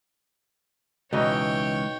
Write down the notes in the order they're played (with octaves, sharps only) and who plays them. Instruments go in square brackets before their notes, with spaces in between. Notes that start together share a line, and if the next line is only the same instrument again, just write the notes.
[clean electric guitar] C#2 E3 [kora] B2 D#4 D#5 [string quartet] C#5 G5